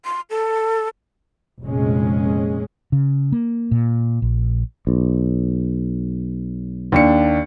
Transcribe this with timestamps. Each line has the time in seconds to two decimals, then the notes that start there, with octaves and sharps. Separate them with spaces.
0.05 C6
0.30 A4
1.61 F1 A#2 G#3 C#4
2.92 C#3
3.32 A#3
3.71 A#2
4.22 A#1
4.87 B1
6.92 D#2 D4 C#7